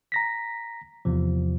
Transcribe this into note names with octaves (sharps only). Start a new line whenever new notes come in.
A#5 A#6 B6
E2 C3 F3